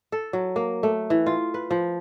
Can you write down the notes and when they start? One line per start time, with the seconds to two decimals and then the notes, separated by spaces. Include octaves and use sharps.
0.12 A4
0.33 F#3
0.56 A#3
0.83 A3
1.10 E3
1.26 F4
1.54 B4
1.71 F3